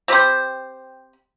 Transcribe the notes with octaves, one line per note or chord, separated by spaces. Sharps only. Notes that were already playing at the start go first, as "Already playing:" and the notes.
C4 G4 B4 C5